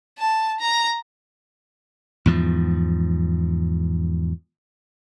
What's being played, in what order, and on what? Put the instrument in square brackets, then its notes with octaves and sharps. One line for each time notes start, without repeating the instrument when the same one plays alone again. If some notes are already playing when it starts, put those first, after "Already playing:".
[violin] A5
A#5
[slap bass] E2 G#2 F3